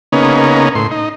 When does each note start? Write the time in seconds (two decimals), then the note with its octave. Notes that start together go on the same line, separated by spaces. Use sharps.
0.12 C#3 A#3 B3 C#4 D#4
0.75 A2 C6
0.91 D#4